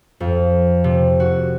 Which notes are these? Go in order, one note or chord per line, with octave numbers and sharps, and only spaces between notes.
F2
C3
F#4